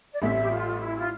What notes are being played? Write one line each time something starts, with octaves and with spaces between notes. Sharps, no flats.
D5
A1 A2 G3 C4 E5
G4
F4
E4
F4